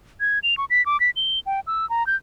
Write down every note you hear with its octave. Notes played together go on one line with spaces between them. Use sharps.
G#6
F7
C#6
B6
D6
B6
G7
G5
E6
A#5
G6